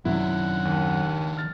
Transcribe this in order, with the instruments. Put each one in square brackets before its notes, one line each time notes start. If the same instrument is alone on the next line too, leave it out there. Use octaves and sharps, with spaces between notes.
[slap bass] F#2 C3 F#3 [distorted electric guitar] D#3 D4 [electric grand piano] E4 [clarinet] F#5
[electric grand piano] D#2
F6 A6